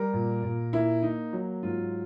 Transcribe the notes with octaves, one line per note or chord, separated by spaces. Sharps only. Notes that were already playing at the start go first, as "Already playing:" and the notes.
Already playing: G3 A#4
A#2
A#2
A#3 E4
A#3 D#4
F#3
G#2 F4